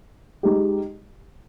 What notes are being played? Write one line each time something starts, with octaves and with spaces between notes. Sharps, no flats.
G#3 D#4 G4